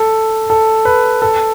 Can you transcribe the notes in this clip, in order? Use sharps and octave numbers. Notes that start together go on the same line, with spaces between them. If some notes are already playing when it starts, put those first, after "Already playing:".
Already playing: A4
A4
B4
A4